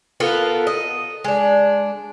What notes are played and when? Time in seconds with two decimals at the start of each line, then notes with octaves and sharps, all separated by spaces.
0.20 B3 F4 A4 A#4
0.67 D#5
1.24 G#3 D4